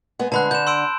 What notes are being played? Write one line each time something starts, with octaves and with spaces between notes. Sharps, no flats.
G#3 B3
D3 G#3 A5 B5 F#6
D3 G6 E7
C6 E6 D7